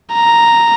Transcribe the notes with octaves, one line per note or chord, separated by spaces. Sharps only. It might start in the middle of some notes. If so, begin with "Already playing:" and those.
A#5